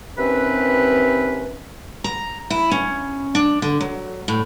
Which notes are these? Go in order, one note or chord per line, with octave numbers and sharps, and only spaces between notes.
D#2 C3 C4 C#4 B4
A#5
E4
C#4
D4
D3
F#3
A2